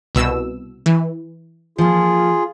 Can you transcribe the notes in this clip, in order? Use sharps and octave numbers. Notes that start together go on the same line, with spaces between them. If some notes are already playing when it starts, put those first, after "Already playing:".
C2 B2 E6
E3
F3 A#3 F4 G#4